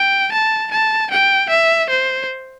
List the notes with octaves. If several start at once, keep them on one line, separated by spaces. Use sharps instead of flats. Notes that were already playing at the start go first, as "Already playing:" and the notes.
Already playing: G5
A5
A5
G5
E5
C5